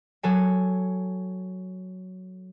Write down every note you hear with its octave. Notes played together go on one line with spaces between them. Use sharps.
F#3 A4 G#5